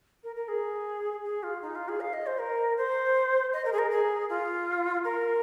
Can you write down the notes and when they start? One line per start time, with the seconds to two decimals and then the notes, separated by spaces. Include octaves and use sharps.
0.24 A#4
0.36 A#4
0.48 G#4
1.25 G#4
1.43 F4
1.62 D#4
1.75 F4
1.89 G#4
2.00 F5
2.13 D#5
2.26 C5
2.39 A#4
2.77 C5
3.53 D#5
3.65 A#4
3.73 G#4
3.78 A#4
3.91 G#4
4.29 F4
5.04 A#4